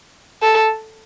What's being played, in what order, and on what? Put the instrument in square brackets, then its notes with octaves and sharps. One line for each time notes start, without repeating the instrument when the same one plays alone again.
[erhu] A4